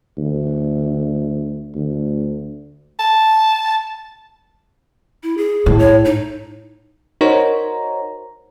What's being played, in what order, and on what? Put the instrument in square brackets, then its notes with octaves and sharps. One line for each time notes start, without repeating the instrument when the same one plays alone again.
[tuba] D2
D2
[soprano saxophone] A5
[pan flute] E4
G#4
[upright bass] A2
[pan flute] C#5
D#4
[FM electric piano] D#4 F#4 A#4 C5 C#5 A#5